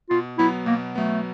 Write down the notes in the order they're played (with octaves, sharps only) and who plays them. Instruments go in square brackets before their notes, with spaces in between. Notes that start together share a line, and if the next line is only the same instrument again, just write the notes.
[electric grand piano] B2 [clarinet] F4
[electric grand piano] F#3 B3 [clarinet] E4
[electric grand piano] B2 [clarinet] A#3
[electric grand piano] F#3 B3 [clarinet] A3